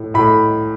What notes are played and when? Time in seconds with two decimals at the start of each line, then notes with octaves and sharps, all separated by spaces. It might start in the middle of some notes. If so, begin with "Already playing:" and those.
Already playing: A2
0.14 A2 B5